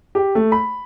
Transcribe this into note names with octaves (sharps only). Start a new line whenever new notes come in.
G4
A3
B5